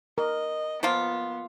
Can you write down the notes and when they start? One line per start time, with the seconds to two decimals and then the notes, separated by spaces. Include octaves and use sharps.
0.18 A#4 D#5
0.83 F3 A#3 B3 F4